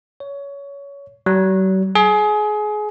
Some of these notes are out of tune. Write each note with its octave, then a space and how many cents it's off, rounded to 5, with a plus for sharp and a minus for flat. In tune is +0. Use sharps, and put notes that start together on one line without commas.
C#5 +20
F#3 +45
G#4 +25